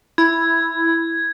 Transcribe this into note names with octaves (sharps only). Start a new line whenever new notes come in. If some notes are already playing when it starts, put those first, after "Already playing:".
E4 G#6